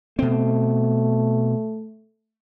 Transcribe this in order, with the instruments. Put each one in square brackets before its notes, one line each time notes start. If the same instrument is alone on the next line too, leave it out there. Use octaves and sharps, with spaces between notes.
[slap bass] B2 C4 [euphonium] A3